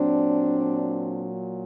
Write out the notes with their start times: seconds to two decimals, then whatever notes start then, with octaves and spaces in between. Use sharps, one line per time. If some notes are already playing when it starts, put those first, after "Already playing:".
Already playing: A#2 F#3 C4 D4